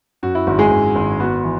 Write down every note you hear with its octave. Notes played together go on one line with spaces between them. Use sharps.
F#2 F#4
E4
G#1 F#4
G#3 G#4
G#1
G#1
B3 F#4
E3